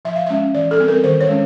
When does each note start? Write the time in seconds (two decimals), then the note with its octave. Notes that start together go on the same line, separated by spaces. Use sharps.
0.05 F3 E5
0.16 F5
0.26 G#3 C#4 E5
0.54 E3 D5
0.71 A4
0.79 G3 C4
0.88 A#4
1.04 D#3 C5
1.21 C#5
1.29 G#3 C#4